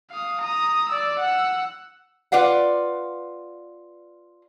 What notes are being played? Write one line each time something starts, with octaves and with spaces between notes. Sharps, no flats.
F5 D#6
A#5 D#6
D5 E6
F#5 E6
F4 B4 D5 F5 F#5